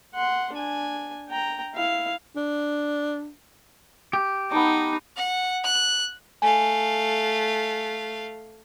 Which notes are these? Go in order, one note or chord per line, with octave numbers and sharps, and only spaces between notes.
F#5 C6
D4 G#5
G5 A#5
E4 F5
D4
G4
B3 D#4 A5 D6
F#5
F#6
A3 F5 G#5